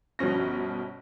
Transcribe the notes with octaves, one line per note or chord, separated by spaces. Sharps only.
G1 B2 F3 C#4 A#6